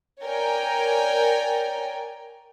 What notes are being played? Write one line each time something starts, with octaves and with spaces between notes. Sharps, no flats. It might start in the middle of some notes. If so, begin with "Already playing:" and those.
A#4 C#5 D5 G5 G#5